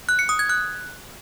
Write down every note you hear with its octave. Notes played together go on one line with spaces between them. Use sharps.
F#6
C#7
D#6
G#6
F#6